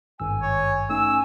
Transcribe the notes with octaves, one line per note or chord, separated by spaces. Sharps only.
G#1 G2 G#5 E6
C#5
A3 C#4 D#4 G#5 E6